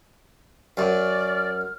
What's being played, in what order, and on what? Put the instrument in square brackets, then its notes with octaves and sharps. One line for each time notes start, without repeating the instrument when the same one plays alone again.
[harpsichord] F#2 [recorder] D5 [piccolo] F6